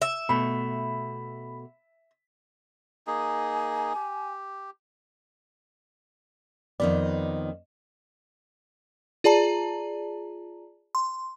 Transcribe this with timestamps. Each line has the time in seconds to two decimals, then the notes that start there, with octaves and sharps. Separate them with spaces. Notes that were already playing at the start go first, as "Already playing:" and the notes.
0.02 E5
0.29 B2 A3 B5
3.07 A#3 D#4 G#4 G#5
3.95 G4
6.80 F2 D#3 B3 D5
9.24 F4 G#4 D5 A5 A#5
10.95 C6